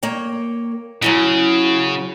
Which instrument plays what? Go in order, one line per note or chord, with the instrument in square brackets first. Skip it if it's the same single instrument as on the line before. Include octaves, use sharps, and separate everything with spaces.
[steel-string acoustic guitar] A#3 C#5 G5
[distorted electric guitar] C#3 [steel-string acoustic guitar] F#3 C#4 F#4 [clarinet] E4